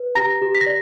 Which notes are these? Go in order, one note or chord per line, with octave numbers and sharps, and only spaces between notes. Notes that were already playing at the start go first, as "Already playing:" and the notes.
Already playing: B4
G4 A#5 A#6
G4
B6
A#6
D5